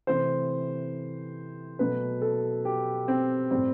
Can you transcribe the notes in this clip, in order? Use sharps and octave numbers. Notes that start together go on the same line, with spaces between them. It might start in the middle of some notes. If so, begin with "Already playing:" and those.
C3 E3 A3 C5
B2 F#3 A3 B4
A4
G4
C4
A2 G3 C4